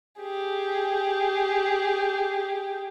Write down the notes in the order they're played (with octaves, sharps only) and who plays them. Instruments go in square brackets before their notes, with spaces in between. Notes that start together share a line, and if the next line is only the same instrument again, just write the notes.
[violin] G4 G#4